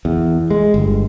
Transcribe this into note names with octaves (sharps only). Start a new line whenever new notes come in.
E2
G#3
G1